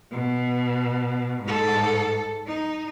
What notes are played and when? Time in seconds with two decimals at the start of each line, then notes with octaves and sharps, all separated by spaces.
0.12 B2
1.43 G#2 A4
2.46 D#4